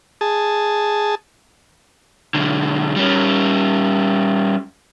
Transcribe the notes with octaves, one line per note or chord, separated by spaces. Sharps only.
G#4 A5
B1 D3
G3 C#4